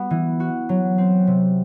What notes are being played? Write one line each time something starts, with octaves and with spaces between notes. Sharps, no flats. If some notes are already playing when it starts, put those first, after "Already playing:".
Already playing: G3 B3 F#4
E3
F#4
F#3
C4
C3